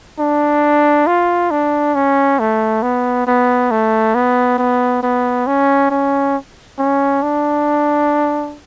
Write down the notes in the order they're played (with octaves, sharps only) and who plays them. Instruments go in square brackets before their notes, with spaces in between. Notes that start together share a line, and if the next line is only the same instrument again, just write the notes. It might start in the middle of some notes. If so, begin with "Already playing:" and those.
[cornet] D4
F4
D4
C#4
A3
B3
B3
A3
B3
B3
B3
C#4
C#4
C#4
D4